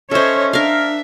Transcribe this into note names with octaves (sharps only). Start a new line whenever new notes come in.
C#4 A4 C5 C#5 D#5 E5
D4 A#4 E5 F5